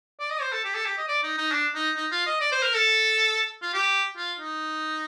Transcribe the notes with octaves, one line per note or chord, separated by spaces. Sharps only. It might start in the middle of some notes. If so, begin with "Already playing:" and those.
D5
D#5
C5
A4
G4
A4
G4
D#5
D5
D#4
D#4
D4
D#4
D#4
F4
D#5
D5
C5
A#4
A4
F4
G4
F4
D#4